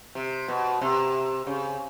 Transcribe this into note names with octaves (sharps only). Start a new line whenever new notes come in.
C3
B2
C3
C#3